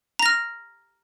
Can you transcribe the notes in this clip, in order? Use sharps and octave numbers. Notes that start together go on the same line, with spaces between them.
A#5 F6 A#6